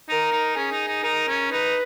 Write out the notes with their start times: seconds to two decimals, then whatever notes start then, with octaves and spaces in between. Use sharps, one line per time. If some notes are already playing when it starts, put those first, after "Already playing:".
0.09 D#4 A#4
0.33 D#4
0.57 C#4 G#4
0.72 D#4
0.88 D#4
1.03 D#4 A#4
1.28 C#4
1.52 D#4 B4